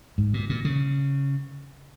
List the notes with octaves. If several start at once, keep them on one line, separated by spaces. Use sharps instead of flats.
G#2
A#2
A#2
C#3